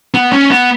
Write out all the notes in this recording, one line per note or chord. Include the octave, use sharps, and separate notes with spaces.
B3
C#4
B3